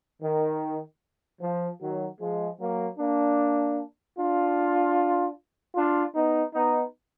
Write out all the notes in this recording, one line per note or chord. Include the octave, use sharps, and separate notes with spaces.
D#3
F3
D#3 F#3
F3 G#3
F#3 A#3
A#3 D4
D4 F4
D4 F4
B3 D#4
B3 D#4